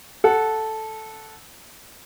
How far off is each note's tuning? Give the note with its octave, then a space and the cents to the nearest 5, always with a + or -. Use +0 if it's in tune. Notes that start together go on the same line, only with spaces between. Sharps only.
A4 -5 F#5 +0